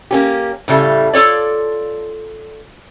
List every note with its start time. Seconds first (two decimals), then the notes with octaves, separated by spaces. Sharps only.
0.11 A#3 C#4 G4
0.68 A2 C#3 G3 A3
1.13 F4 A4 C#5 D5